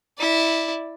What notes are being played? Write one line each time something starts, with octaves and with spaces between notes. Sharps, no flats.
E4 D5